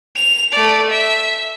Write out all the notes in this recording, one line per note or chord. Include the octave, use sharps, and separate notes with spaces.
F7
A3 D5
E5